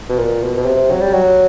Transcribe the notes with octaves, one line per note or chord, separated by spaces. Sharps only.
B2
A#2
B2
B2
C3
F#3
G3
F#3